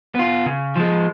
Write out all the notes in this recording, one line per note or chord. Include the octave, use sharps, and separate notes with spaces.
B3 F4
C#3
F3 G#3